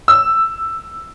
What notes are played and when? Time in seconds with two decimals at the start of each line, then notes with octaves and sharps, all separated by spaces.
0.08 E6